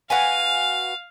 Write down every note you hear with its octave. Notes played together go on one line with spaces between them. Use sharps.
F#4 B4 F5 G#5